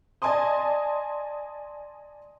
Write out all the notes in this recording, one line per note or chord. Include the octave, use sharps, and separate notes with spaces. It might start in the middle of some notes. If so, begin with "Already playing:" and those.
D5 D#5 G#5 A5 C6 D#6